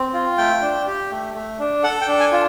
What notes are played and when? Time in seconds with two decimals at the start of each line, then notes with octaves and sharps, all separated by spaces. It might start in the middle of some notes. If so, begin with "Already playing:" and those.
Already playing: C4
0.13 F4
0.38 A3 G5
0.62 D4
0.87 G4
1.11 A3
1.35 A3
1.59 D4
1.83 A4 F#5
2.01 G5
2.08 D4
2.20 G#5
2.32 F4